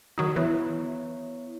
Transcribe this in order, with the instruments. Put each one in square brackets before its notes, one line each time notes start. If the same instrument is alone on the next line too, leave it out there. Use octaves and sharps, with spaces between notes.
[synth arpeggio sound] D#3 F#3 D#4
[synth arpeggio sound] E3 [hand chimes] B3 E4 C#5